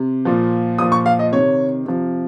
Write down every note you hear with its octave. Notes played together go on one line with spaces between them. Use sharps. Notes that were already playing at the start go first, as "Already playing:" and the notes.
Already playing: C3
A#2 F3
A#2 F3 D#6
C#6
F5
D#5
C3 D#3 C#5
C3 F3